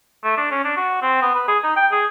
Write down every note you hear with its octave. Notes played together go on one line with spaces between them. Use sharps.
A3
D4
C#4
D4
F#4
C4
B3
B4
G#4
D#4
G5
G#4